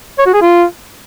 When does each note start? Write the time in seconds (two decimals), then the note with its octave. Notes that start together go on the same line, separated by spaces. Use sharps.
0.19 C#5
0.26 F#4
0.34 G#4
0.42 F4